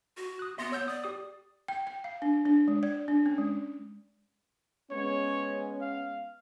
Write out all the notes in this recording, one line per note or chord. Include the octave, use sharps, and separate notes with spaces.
F#4
D#6 F#6
B3 E5 C6 A#6
B3 C#5 E6 G6
D5 D#6
G4 D#6
G5
G5
F5
D4
D4
G#3
D5
D4
C#4
G#3
G#3 B3 C#4 C#5
F5